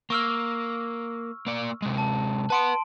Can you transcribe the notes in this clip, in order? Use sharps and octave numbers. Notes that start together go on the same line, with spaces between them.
A#3 C#6 E6 F6
A#3 D5
C3 G#3
A5
B4 F#5 A5 C6 D7